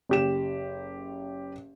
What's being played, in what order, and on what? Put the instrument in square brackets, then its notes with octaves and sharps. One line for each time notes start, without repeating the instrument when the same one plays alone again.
[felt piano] F#1 G4 E7